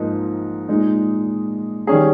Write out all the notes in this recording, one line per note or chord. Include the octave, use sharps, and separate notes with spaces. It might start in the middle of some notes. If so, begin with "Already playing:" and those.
Already playing: G#2 F3 A#3 D#4
A#2 G#3 D#4
D#3 G3 C#4 G#4